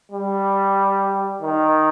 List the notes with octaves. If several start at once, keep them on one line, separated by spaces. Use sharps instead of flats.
G3
D#3